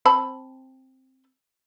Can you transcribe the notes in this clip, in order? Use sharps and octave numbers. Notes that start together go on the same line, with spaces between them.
C4 A5 B5